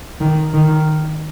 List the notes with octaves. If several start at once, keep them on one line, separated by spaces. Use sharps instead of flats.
D#3
D#3